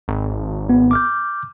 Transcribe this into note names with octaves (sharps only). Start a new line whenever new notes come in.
G#1
B3
D6 F6 G6